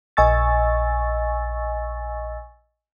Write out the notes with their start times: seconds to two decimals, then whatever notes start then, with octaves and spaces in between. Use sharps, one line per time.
0.17 A#1 D#5 G#5 C#6 E6 A6